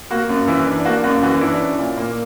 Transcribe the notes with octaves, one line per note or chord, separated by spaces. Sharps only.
A#3 F#4
F#2
E3 E4
D4
A#3 F#4
F#2 F#4
E3 F#4
D4 E4
C#4
A#2
A#3